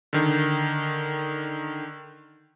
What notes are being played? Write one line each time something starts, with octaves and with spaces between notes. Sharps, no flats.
D3 D#3